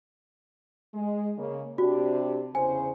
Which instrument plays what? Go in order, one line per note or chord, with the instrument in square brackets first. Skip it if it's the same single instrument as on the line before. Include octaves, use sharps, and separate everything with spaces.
[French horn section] G#3
C#3 G#3 A#3
[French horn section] C3 D4 G4 [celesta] F#4
[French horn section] E2 C#3 C5 [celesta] G#5